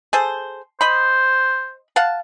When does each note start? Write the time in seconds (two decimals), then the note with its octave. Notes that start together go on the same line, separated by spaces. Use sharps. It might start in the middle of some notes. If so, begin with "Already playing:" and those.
0.13 G#4 A4 C5
0.81 C5 D#5 B5
1.96 F5 F#5 A5